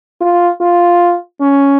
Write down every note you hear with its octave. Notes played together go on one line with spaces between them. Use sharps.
F4
F4
C#4